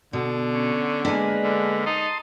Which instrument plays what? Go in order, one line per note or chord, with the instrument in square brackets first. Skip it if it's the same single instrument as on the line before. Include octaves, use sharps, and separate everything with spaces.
[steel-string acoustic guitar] B2 [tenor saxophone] D3
[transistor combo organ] C#4
[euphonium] G#3 [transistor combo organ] A#3 B4 [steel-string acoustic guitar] D4 G#5
[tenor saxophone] D3
[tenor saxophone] D#4 [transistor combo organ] A5 C6 D#6